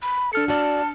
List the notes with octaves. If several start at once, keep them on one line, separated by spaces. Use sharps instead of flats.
B5
D4 A4 F6 C#7
F#4 D5 A5